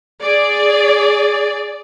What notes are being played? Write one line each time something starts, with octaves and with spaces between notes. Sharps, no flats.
G#4 D5